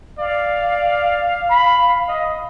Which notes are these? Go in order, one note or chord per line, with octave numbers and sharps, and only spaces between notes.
D5 F5
B5
D#5